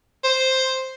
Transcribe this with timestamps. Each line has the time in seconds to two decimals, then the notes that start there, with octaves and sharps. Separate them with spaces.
0.24 C5